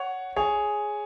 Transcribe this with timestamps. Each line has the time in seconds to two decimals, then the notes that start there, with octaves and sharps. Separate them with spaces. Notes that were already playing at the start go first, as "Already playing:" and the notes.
Already playing: C#5 F#5
0.36 G#4 C#5